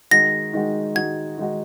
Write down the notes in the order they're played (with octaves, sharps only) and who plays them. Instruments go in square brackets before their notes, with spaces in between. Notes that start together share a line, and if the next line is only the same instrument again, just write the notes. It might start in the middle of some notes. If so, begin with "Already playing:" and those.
[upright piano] D#3 G#3 D#4 F#4 [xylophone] A#6
[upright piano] D#3 G#3 D#4 F#4
[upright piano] D#3 G#3 D#4 F#4 [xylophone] G#6
[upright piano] D#3 G#3 D#4 F#4